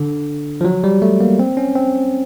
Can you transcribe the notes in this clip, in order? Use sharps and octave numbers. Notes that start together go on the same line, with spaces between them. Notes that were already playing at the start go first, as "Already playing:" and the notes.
Already playing: D3
F3
F#3
G3
A3
A#3
C4
C#4
C4